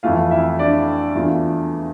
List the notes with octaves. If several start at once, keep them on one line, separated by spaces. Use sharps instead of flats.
F2 E3 A3 F4 F5
E4 E5
D4 D5
E2 E3 A3 D4 F4